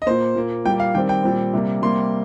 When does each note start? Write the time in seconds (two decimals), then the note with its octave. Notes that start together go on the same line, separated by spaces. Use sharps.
0.02 D#5
0.06 A#2 A#3 C5
0.35 A#2 A#3
0.65 A#2 G3 A#3 G5
0.80 F5
0.95 D#3 G3 C4 G5
1.09 G5
1.23 A#2 G3 C4
1.53 C3 G3 A#3
1.82 C3 G3 A#3 C6